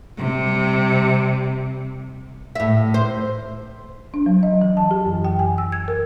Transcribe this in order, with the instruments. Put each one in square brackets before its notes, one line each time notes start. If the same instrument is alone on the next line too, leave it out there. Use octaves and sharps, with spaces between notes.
[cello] C3 G3
[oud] A2 E5
C5
[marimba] D4
F#3
D#5
E3
A5
G4
F#2
G5
G#5
E6
G#6
A#4